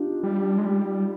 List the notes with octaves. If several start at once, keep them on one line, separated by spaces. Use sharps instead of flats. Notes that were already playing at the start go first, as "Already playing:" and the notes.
Already playing: D4 D#4 F4 G4
G3
G#3
G3